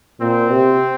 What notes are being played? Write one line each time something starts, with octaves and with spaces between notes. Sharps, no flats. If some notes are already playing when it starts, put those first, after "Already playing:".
A#2 C4
C3